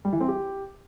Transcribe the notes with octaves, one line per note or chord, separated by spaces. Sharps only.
G3
E3
C4
G4